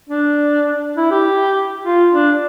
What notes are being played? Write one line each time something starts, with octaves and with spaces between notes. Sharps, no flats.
D4
E4
G4
F4
D4